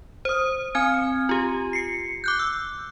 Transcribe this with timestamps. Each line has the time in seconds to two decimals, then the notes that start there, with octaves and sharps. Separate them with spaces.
0.25 C5 D#6
0.75 C4 G#5 F6 G#6
1.29 F4 G4
1.73 C7 C#7
2.24 D6 F#6 G6
2.39 E6